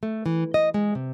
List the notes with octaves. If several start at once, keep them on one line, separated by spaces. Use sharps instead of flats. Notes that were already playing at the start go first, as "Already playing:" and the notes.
A3
E3
D#5
G#3
C3